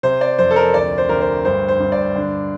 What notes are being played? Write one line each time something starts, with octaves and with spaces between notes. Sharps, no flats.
C3 C5
D5
F2 C5
A4
A#4
D2 D5
C5
D2 A#4
C5
G2 C5
C5
G2
D5
D3